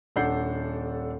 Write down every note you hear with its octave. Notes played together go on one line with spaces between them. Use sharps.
D#1 D4 A4 F#5 G6 C7